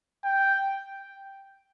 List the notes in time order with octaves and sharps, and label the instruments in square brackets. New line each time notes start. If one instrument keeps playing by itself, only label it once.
[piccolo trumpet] G5